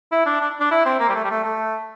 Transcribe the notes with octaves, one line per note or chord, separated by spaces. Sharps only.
E4
D4
D4
D4
E4
C4
A#3
G3
A3
G3
A3
A3